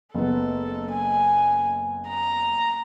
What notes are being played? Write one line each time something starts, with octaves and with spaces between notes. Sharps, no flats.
F#1 B3 A4
G#5
A#5